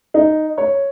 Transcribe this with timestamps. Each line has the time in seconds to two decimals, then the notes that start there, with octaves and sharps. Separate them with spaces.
0.14 D#4
0.58 C#5